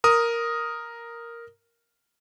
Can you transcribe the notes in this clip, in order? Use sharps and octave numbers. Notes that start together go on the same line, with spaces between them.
A#4 D#6